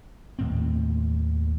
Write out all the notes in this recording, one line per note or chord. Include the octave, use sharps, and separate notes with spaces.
D#2 A2 C4